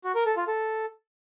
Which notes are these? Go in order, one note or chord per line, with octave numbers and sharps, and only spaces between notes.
F#4
A#4
A4
F4
A4